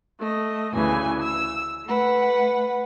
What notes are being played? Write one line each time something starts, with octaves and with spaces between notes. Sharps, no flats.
A3 D#5
D2 C#3 E3 G#5
E6
A3 B4 F#5